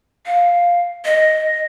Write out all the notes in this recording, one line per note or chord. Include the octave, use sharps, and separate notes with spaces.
F5
D#5